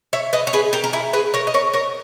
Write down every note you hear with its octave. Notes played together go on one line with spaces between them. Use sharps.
C#5 E5
B4 D#5
C#5
G#4 B4
G4 A#4
A#4
E4 G#4
G#4 B4
A#4 C#5
D#5
A#4 C#5
A#4 C#5